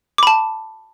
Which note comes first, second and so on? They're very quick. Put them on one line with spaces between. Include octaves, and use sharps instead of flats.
D6 B5 A5